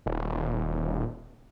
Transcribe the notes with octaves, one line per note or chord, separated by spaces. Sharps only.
D#1